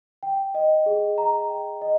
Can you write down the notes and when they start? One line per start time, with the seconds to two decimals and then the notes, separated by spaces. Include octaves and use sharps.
0.23 G5
0.55 D#5
0.86 G#4
1.18 A#5
1.50 G5
1.81 D#5